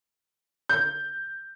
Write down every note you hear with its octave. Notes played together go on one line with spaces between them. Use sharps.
G6